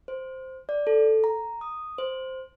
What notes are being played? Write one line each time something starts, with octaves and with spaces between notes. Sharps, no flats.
C5
D5
A4
A#5
D#6
C5